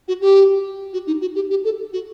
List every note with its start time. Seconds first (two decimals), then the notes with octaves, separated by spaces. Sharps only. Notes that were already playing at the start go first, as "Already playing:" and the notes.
0.08 F#4
0.22 G4
0.93 F#4
1.07 D#4
1.21 F#4
1.35 G4
1.50 G4
1.64 A4
1.93 F#4